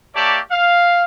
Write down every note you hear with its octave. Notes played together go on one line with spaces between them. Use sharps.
A#3 G4 C#5 D5 E5 A5
F5